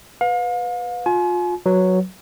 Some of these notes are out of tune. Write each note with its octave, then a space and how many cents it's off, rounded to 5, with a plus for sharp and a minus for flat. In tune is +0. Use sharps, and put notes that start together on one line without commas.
B4 +0 F5 +35
F4 +30 G#5 +40
F#3 +0 B4 +0